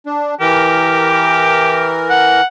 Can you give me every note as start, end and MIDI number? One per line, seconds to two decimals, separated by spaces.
0.06 0.35 62
0.40 2.41 52
0.40 1.99 67
0.40 2.41 70
2.10 2.44 78